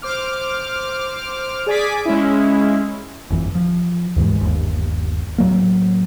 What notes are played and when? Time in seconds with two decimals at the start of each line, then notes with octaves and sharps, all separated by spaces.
0.02 C5 D6 F6
1.67 G#4 D5 G#5 D6 B6
2.05 G#3 C#4 E4
3.30 G1 F2 E3
3.55 F3
4.16 D#2 G#2 E3 G#3
4.41 G1 D#2
5.38 A2 F#3 A#3